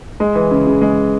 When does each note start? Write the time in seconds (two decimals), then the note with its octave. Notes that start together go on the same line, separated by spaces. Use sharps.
0.20 G#3
0.35 E3
0.51 C#3
0.67 C#3
0.82 G#3